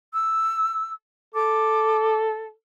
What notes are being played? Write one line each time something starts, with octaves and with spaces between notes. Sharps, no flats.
E6
A4 D6